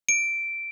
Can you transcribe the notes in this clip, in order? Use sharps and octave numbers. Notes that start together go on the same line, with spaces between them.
D7